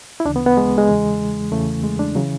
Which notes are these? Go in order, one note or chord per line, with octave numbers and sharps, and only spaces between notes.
E4
D2 C#3 E3 D4
B3
B3
G#3
G#3
E2 C#3 E3
E2 C#3 E3 A3
G#3
D4
C#3 E3 F#3